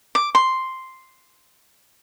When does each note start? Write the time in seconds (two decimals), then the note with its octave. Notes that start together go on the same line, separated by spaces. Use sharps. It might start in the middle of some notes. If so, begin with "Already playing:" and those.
0.15 D6
0.35 C6